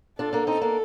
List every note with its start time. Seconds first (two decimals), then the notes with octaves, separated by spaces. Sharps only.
0.19 D4 F4 A4
0.33 A#3 D4
0.47 C4 D#4
0.62 A#3 D4